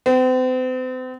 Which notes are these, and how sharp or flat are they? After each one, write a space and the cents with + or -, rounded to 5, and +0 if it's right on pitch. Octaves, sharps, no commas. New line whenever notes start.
C4 -40